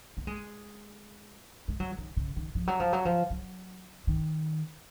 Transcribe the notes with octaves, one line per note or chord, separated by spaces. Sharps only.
A#3
G#3
G#3
F#3
D#3
C#3
D#3
F3
F#3
F3
F#3
F3
F#3
D#3